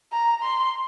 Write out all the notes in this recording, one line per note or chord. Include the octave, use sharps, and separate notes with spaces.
A#5
C6